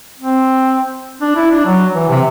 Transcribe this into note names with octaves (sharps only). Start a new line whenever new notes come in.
C4
D4
E4
D4
F#3
E3
C3